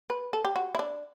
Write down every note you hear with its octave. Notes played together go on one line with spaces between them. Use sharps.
B4
A4
G4
F#4
E4
D4